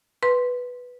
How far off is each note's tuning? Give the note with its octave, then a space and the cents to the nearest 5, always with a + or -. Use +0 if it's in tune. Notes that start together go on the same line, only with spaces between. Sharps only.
B4 +0 C6 +0